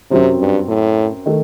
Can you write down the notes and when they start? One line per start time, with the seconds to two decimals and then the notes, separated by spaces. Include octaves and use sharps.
0.11 F#2 C3 F#3 C4
0.39 G2
0.68 A2
1.26 D#3 A3